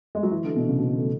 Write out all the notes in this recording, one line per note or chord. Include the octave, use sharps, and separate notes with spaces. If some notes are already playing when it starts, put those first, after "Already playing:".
G#3
F#3
E3
D3
B2
C#3
B2
A3